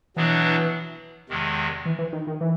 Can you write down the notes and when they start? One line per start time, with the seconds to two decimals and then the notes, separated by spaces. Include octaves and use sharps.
0.16 B2 E3 F#3 B3 D4
1.29 E2 C3 D#3 G#3
1.85 E3
1.99 E3
2.13 D#3
2.27 D#3
2.41 E3